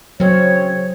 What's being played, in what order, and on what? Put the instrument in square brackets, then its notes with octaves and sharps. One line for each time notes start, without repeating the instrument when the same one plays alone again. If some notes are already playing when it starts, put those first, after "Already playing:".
[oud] C#3 C4 [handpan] F#3 [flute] C#5